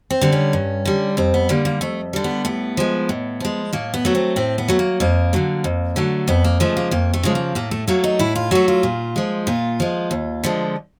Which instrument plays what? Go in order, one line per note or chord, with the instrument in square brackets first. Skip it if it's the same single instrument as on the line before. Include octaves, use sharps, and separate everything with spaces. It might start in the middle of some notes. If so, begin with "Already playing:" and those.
[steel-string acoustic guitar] C4
D3 G3
C#4
G2
D3 G3
F2 C4
B3
D3 G3 A#3
A#3
F2 A3
D3 G3
B3
A2 B3
F3 G#3
A2
F3 G#3
A2 A#3
B3
F#3 A3
C4
A2 C4
B3
F#3 A3
A#3
F2 A#3
D3 F#3 A3
F2
D3 F#3 A3
F2 B3
A#3
C#3 F3 G#3 A3
A#3
F2 A#3
A3
C#3 F3 G#3
A#3
A2 A#3
A3
F#3 A3 A#3
D#4
A2 E4
F4
F#3 A3 F#4
F4
A#2
F3 G#3
A#2 F4
F3 G#3
D#2
D3 F3 G#3